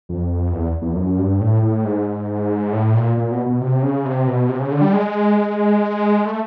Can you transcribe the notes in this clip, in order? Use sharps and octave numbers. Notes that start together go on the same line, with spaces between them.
F2
E2
E2
F2
F#2
G2
A2
A2
G#2
A2
A#2
A#2
B2
B2
C3
C#3
C3
B2
C3
C#3
D3
G3
G#3
A3